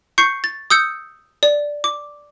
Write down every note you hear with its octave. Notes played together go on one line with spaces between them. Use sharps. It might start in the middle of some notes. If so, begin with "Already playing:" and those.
C#6 G6 C7 C#7
A6
D#6 E6 G6 C#7
D5
D6